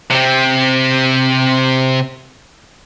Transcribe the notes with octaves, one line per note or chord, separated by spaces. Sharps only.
C3 C4